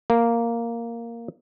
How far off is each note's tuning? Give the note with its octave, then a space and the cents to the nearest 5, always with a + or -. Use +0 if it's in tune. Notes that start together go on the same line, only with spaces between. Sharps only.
A#3 -5